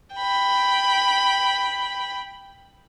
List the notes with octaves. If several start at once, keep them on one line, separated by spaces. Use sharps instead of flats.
G5 B5